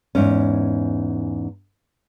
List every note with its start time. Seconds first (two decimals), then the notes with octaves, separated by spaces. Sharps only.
0.15 E2 G#2 C#4